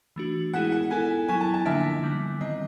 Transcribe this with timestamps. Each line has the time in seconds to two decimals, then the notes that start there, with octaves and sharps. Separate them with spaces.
0.16 E3 A3 D4 F#4
0.53 G#3 B3 E4 G#4 F#5
0.72 F#5
0.91 B3 E4 A4 G#5
1.28 F#3 B3 E4 G#5
1.41 A5
1.54 A5
1.65 D3 F3 A#3 D4 E5
2.03 D3 G3 B3
2.41 D#3 G3 C4 D#5